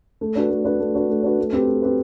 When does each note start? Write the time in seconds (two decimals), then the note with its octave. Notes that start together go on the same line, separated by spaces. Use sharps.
0.21 A3
0.35 D4 F#4 B4
0.50 A3
0.65 D4 F#4 B4
0.80 A3
0.95 D4 F#4 B4
1.09 A3
1.23 D4 F#4 B4
1.39 A3
1.52 C4 G4 B4
1.67 A3
1.82 C4 G4 B4